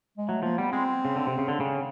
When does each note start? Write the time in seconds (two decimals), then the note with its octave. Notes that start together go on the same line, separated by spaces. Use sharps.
0.17 G#3
0.28 F#3 A3
0.43 F3 A#3
0.57 G3 B3
0.72 G#3 C4
1.05 C#3
1.16 D3
1.27 C3
1.38 C#3
1.48 D3
1.60 C#3